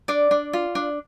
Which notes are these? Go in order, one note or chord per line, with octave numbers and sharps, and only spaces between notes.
D4 D5
D4
F4
D4